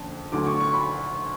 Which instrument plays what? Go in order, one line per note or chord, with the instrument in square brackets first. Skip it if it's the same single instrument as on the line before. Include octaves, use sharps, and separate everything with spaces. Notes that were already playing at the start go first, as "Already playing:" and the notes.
Already playing: [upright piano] F#1 F2 D3
D2 D3 F#3 D6
C#6
C#6
B5